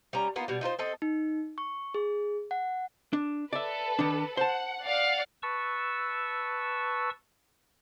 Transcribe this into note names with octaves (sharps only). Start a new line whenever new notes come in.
G3 C#4 A#5
A#3 B3 D#4 F4
B2 G3
D#4 F4 A#4 C5
C4 A4 D#5
D#4
C#6
G#4
F#5
D4
A4 B4 D5 E5
D#3 D4
C5 F#5 A5
D5 F5 F#5
B4 A5 C#6 E6